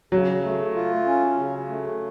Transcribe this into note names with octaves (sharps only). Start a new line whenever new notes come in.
C#3 F#3
A3
F4
C#4
C#3
A3